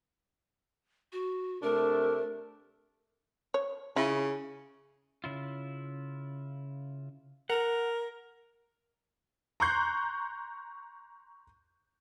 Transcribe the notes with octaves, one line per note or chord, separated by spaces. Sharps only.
F#4
C3 A3 D4 A#4
C#5
C#3 E4 F4
C#3 E4 F4
A#4 F#5
A#5 C6 C#6 F#6 G6 C7